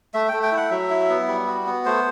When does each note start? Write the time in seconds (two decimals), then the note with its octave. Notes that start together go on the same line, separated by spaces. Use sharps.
0.14 A3 E5
0.28 A3 G5
0.43 G5
0.52 E4
0.57 F#5
0.71 F#3 E5
0.90 E4
1.09 B3
1.28 G3
1.47 F#4
1.66 B3
1.86 A3 C5